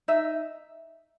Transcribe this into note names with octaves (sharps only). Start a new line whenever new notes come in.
D#4 E5